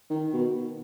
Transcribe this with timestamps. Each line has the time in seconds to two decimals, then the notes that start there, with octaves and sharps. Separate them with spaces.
0.10 D#3
0.33 B2